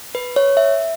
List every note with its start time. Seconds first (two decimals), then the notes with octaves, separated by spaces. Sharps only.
0.15 B4
0.36 C#5
0.57 E5